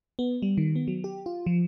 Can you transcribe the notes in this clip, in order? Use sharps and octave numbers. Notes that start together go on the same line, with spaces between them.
B3
G3
D#3
B3
F#3
G4
F4
F3